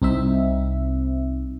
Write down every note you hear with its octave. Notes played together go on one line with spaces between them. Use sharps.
C2 C4 D#4 E5